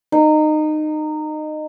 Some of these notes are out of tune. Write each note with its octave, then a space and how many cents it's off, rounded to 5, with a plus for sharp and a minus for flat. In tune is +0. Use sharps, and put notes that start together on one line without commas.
D#4 -20